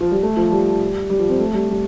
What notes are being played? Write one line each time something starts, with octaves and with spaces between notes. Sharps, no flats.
F3
G3
A3
F3
G3
G3
F3
C4
A3
G3
G3